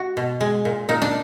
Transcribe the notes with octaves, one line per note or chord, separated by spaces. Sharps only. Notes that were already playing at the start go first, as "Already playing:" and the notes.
Already playing: F#4
B2
G#3
A#2
A#2 D#4
D4